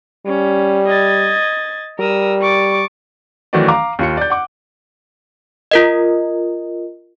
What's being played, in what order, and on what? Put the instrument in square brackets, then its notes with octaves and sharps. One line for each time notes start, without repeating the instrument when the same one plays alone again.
[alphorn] G3 [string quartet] C#4
[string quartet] D#5 G#6 A6
[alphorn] G3 [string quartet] A#4 D#6 E6
[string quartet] C#6 D6 A6
[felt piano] D#3 E3 F#3 A3 F#4 D5
F5 A#5 D6
D#2 F4 C#7
D5 G6
F#5 D6
[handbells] F4 A#4 D#5